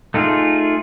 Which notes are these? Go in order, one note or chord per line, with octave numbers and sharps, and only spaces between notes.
A3 D#4 F4 G#4